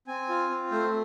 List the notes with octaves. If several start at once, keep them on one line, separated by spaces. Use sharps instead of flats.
C4 G#5
F4
C4
A3 C5